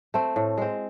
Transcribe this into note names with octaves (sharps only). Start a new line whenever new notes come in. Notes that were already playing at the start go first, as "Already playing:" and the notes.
A3 C4
A2
G#3 C4